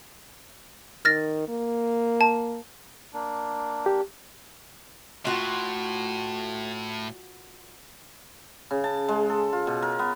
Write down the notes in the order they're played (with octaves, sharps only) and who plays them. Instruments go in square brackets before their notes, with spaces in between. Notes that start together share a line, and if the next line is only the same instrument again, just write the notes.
[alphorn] D#3 [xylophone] F6 A6 A#6
[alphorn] A#3
[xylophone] A5
[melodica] A#3 D4
[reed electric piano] G4
[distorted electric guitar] A2 [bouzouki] F4 F#4
[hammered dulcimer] C#3
A5
G#3
A4
F4
B2
A#4
B3